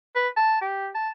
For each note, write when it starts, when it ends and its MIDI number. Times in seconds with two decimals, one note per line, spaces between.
0.15 0.28 71
0.36 0.61 81
0.61 0.89 67
0.95 1.09 81